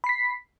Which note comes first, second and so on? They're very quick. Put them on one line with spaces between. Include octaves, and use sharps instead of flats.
B5 C7 B6